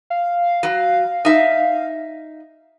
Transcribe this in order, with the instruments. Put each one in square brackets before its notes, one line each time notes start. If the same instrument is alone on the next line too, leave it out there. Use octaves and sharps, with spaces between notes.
[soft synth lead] F5
[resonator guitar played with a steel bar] F#3
D#4 E5